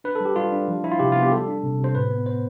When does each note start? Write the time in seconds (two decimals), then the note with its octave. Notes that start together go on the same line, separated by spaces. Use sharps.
0.04 D4 B4
0.15 A4
0.20 G3 G4
0.36 G3 F4
0.52 D4
0.68 F3
0.84 F3 E4
0.91 F4
0.99 C3 G4
1.12 B3 F4
1.22 G4
1.32 G3 A4
1.48 D4
1.63 C3
1.79 C3
1.84 C5
1.95 A2 B4
2.11 B3
2.26 B3 C5